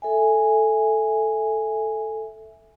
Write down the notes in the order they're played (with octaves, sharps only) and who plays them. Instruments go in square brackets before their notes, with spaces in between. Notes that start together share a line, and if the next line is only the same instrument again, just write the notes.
[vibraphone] A4 E5 G#5